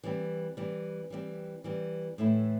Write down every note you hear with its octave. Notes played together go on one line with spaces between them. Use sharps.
E3 G3 C4
E3 G3 C4
E3 G3 C4
E3 G3 C4
A2 E3 A3 E4